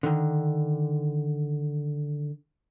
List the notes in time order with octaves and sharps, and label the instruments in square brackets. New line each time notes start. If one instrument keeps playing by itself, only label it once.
[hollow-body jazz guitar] D3 D#3